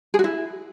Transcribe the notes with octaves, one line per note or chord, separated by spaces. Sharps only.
G#4
F#4
E4